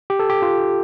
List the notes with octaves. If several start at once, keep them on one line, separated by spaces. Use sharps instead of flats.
G4
A4
G4
F4